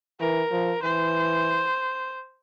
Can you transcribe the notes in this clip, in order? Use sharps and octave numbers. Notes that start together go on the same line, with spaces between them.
E3 A#4
F3
E3 C5